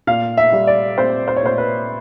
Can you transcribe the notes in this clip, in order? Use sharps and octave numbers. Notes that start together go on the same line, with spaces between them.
A#2 F5
E5
G3
D5
C4 C5
C5
C#5
A#2 C5
B4